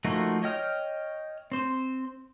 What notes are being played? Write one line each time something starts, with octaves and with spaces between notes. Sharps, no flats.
F3 A3 A#3 D#4 F#4
C#5 D#5 G5 F6
C4 C5